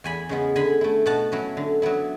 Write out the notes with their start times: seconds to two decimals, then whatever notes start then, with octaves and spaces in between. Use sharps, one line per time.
0.04 E2 G#5 B5
0.29 C#3 G#3 B3
0.56 D3 G#5 B5
0.81 A3 E4
1.06 B2 F#5 A5
1.32 F#3 C#4 E4
1.57 D3
1.82 F#3 B3 E4